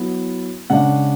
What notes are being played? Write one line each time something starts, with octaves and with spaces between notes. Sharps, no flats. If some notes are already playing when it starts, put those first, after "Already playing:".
Already playing: F#3 B3 E4
C#3 G#3 D4 F#5